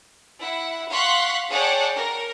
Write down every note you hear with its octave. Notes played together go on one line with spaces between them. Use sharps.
E4 F#5
F5 F#5 C6 C#6 F#6 B6
G#4 C#5 D5 F#5 G5 A5
A#4